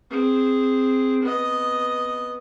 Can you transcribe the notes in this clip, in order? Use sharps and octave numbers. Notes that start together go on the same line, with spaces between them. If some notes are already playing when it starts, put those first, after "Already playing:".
C4 G#4
B3 D#5